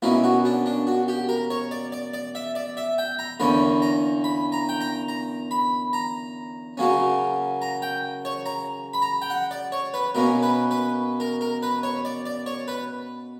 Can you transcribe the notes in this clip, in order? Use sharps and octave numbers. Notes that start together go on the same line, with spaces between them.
B2 A#3 C#4 E4
F#4
D4
D4
F#4
G4
A#4
C#5
D5
D5
D5
E5
D5
E5
G5
A#5
E2 D3 A#3 C#4 B5
A#5
B5
A#5
G5
A#5
A#5
B5
A#5
C#3 F#3 A#3 C#4
A#5
G5
C#5
A#5
B5
A#5
G5
F#5
D5
C#5
B4
B2 A#3 C#4 A#4
B4
B4
A#4
A#4
B4
C#5
D5
D5
C#5
B4